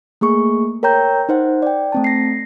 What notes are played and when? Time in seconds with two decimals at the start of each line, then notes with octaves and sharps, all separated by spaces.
0.21 A3 A#3 G#4 C#6
0.83 A#4 C#5 G5 A#5 G6
1.29 D#4 C5 F#5
1.62 D5 G5
1.92 A3 C4 A5
2.04 A#6 C7